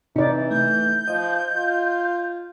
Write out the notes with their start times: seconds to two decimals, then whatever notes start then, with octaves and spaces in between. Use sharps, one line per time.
0.16 C3 E3 D#4 D5
0.51 A3 G6
1.08 F3 D#5
1.55 F4